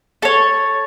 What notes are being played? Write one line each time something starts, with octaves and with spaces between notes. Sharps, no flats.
A4 C#5